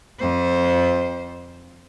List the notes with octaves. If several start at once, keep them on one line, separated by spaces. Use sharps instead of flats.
F2 C5